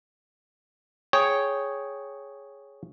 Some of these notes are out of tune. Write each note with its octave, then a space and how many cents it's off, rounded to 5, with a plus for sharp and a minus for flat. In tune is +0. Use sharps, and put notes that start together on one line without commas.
G#4 +0 C#5 +0 G5 +0